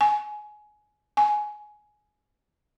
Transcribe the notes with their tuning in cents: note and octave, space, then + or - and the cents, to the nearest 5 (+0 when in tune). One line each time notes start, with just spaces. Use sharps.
G#5 +20
G#5 +15